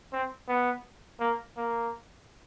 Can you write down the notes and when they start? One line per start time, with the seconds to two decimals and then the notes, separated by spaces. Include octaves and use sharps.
0.12 C4
0.48 B3
1.20 A#3
1.57 A#3